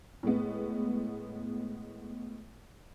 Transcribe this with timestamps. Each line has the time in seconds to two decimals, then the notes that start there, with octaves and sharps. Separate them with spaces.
0.23 A2 G#3 B3